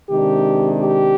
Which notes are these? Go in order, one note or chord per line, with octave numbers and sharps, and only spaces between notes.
C3 D#3 G#3 D4 G4
G4